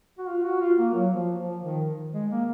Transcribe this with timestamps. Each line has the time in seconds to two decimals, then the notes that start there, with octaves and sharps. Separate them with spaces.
0.18 F#4
0.27 F4
0.44 F#4
0.61 F4
0.78 A#3
0.94 F#3
1.12 F3
1.38 F3
1.63 D#3
2.14 G#3
2.31 A#3